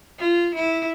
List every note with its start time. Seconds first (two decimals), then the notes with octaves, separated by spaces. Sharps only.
0.18 F4
0.55 E4